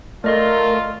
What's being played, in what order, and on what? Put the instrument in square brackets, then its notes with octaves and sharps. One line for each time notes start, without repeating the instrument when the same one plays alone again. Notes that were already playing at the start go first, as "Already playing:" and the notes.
[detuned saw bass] A3 [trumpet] F4 [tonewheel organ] A#4 [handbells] D5 D#5 C6